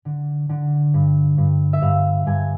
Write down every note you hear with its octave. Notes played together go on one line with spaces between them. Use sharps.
D3
D3
G2
G2
E5
G2 F5
G2 G#5